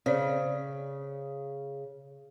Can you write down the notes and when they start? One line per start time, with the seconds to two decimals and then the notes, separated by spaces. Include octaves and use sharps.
0.06 C#3 C5 D5